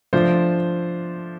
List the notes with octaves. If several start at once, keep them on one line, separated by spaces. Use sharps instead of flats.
F3 A3 D4 F4 C5